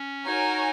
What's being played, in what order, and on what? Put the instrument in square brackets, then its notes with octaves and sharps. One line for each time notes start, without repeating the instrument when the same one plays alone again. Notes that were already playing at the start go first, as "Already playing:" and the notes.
Already playing: [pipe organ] C#4
[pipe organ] D#4 [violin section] F#4 A#4 C#5 G#5